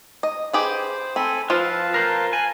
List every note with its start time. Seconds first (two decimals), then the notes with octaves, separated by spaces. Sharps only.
0.23 D#5
0.53 G4 G#4 B4 C5
1.16 C4 A4 G#5 B5
1.50 F3 C4 F4 B4 F5 A5
1.94 A#4 C5
2.33 G#5 F#6